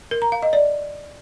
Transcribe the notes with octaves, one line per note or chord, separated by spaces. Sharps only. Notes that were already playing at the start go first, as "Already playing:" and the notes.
A#4
A#5
F5
D#5
D5